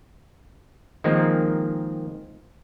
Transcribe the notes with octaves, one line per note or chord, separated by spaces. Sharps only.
D#3 F3 G#3 A#3 C4